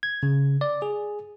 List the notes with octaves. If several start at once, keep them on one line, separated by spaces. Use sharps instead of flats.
G#6
C#3
D5
G#4